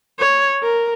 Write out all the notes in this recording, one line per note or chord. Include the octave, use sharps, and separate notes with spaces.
C#5
A#4